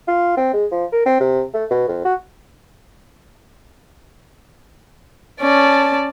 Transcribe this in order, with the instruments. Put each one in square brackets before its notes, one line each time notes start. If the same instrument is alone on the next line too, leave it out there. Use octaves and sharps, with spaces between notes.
[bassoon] F4
C4
G#3
F3
A#4
C4
C3
A3
B2
F2
F#4
[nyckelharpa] C#4 [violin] D5 A5